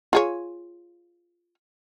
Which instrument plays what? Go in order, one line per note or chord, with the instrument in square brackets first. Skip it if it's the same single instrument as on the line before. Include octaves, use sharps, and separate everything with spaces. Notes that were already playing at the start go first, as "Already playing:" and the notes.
[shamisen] F4 G#4 C#5